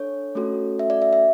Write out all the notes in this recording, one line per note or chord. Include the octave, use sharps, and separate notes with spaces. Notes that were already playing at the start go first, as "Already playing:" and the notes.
Already playing: D4 A4 C#5
A3 C#4 F#4 A4
E5
D5
E5
E5